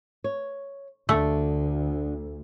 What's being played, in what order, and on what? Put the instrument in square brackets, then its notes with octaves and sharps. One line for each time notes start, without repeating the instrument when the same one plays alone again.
[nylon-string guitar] C#5
[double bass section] D2 [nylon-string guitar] D3 [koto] A3